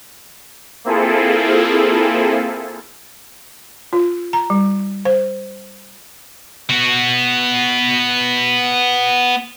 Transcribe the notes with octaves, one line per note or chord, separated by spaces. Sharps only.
A#3 C4 E4 F4 G#4 A4
F4
A#5
G3
C5
B3 F#4